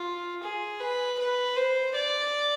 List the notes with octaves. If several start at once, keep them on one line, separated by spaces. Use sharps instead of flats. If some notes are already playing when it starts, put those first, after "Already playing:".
Already playing: F4
G#4
B4
B4
C5
D5